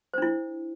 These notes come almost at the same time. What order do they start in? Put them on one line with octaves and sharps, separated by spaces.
C5 D4 E4